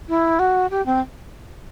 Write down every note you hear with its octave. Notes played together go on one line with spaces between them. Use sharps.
E4
F#4
G4
C4